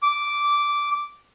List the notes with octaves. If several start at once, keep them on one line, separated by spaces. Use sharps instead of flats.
D6